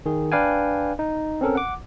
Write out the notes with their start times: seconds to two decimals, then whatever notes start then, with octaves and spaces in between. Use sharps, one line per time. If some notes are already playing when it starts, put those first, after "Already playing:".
0.06 D#3 G#4
0.32 D4 B4 D5 F5 G5 G#5
0.99 D#4
1.41 C4 C#4 A4 A#4
1.55 F#5 D6